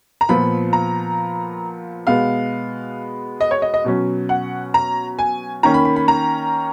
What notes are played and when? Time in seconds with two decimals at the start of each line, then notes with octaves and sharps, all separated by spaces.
0.21 A#5
0.29 A#2 F3 B3 B5
0.73 A#5
2.07 B2 G#3 B3 F5
3.41 D#5
3.51 C#5
3.62 D#5
3.74 D#5
3.84 B2 F#3 C#4
4.29 F#5
4.74 A#5
5.19 G#5
5.63 D#3 A#3 C#4 A#5
5.74 B5
5.85 B5
5.96 B5
6.08 A#5